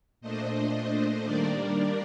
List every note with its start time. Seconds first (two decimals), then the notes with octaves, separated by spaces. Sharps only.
0.21 A#2 A3 D4 C5 D#5
1.24 D#3 G3 A#3 D4 A#4 D5